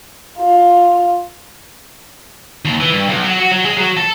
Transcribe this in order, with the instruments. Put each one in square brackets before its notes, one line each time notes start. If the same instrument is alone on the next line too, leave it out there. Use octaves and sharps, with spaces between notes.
[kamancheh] F4
[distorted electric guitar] D#2
E3
G2
B1
F#3
F#4
F#3
G#3
F#3
A4